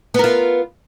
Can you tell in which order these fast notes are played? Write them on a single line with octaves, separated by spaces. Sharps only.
B3 A#4 F4